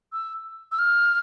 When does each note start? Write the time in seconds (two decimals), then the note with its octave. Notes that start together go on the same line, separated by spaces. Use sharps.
0.13 E6
0.72 E6
0.78 F6